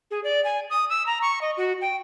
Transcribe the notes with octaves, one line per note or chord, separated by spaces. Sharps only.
G#4
D5
G#5
D#6
E6
A#5
C#6
D#5
F#4
G5